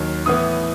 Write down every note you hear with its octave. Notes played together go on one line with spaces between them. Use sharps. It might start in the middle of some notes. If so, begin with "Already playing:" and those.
Already playing: D#2 D#3 F#3
A2 E3 B3 D#6